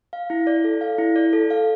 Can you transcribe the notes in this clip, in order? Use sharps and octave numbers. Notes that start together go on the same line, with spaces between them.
F5
E4
D5
A4
F5
E4
D5
A4
F5